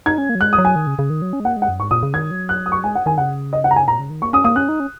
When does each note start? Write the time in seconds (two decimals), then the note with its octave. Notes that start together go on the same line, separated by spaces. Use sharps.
0.06 D#4 G#6
0.18 C#4
0.29 A#3
0.35 F#3
0.41 G#3 F#6
0.53 D#6
0.58 F#3
0.65 G#5
0.76 D#3
0.87 C#3
0.99 C#3
1.10 D#3
1.22 F#3
1.33 C#4
1.40 G#3
1.45 A#3 F#5
1.57 G#3
1.62 F#5
1.69 F#2
1.80 G#2 C#6
1.91 A#2 D#6
2.03 C#3
2.14 D#3 G#6
2.31 F#3
2.49 F#6
2.66 D#6
2.72 C#6
2.84 G#3 G#5
2.95 F#5
3.06 D#3 G#5
3.18 C#3 F#5
3.53 D#5
3.64 F#5
3.71 A#5
3.76 G#5
3.87 A#2 A#5
3.99 C#3
4.10 D#3
4.22 A#3 C#6
4.33 C#4 D#6
4.44 A#3 D#6
4.56 C#4 F#6
4.69 D#4
4.80 C#4